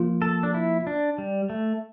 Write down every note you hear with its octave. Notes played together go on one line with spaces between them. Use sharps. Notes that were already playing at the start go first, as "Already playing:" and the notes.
Already playing: F3 A#3 F4
A4
D4
E4
D4
G3
A3